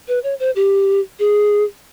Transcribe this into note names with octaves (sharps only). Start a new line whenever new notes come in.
B4
C#5
C5
G4
G#4